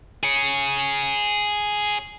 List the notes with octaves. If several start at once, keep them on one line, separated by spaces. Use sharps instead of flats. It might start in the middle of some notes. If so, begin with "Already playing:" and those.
G#4 C#5